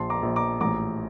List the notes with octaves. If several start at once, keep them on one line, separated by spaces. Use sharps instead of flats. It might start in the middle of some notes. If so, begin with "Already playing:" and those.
Already playing: A#1 A5 C6
A#5 D6
A#1
A#5 D6
A1 A#5 D6